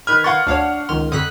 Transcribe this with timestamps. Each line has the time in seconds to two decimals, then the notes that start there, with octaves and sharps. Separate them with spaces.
0.07 D#3 B4 F6 G#6
0.24 F5 F#5 C6 C#6 A6
0.47 D2 D4 C#5 F5
0.89 C#2 D#3 C6 F6
1.12 F2 D3 D#6 F#6 B6